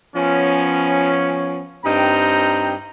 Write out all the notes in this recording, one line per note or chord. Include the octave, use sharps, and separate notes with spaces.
F3 B3 C#4
G2 C4 D#4 G5 A#5